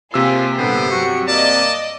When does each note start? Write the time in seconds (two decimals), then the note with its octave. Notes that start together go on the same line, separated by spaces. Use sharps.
0.14 C3 A#3 C#4 F4 G#4 C5 E6
0.58 G2 A#2 D3 B3 C5
0.91 F#3 F#4 C#7
1.28 A#3 D5 D#5 A5